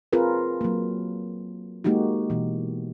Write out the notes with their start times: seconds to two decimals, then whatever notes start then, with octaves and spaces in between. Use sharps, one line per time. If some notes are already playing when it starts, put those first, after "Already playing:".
0.13 C4 F4 G#4 A#4 B4
0.61 F#3 A#3
1.84 G#3 A#3 D#4 F#4 G4
2.30 B2 E3